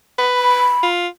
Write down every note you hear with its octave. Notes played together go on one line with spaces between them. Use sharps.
B4
B5
F4